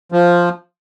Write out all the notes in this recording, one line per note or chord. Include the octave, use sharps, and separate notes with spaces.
F3